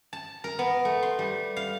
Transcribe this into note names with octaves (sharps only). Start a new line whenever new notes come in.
A5
A#4
B3
A3
C6
G3
F5